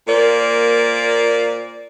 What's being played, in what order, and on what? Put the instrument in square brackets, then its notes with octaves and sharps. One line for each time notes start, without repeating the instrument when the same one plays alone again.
[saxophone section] A#2 A#3 C5 D5